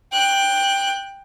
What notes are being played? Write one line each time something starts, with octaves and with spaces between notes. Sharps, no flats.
G5 F#6